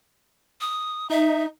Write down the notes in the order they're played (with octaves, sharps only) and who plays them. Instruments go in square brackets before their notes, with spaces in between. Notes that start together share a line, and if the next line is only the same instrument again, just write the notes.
[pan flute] D#6
[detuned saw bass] D#4 [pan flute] E5